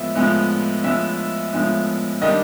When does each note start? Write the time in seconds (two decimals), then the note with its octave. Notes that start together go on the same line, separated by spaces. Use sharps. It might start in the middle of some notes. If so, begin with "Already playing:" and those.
Already playing: A2 F3 G#3 B3 E5
0.15 A2 F3 G#3 B3
0.84 A2 F3 G#3 B3 E5
1.53 A2 F3 G#3 B3
2.22 D#3 G3 A#3 D4 D#5